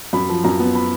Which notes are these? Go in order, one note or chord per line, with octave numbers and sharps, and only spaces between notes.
F#2 B5
F3
F#2 A#5
B3
B5